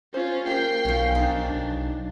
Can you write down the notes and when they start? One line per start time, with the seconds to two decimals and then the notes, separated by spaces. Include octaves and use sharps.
0.14 C#4 F4 C5
0.47 A#3 G4 A#4 G5 C7
0.85 B1 F3 C#4
1.15 D4 D#4
1.51 B1